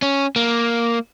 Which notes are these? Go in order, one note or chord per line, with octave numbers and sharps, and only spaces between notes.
C#4
A#3